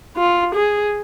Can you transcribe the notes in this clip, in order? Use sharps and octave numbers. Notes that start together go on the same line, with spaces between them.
F4
G#4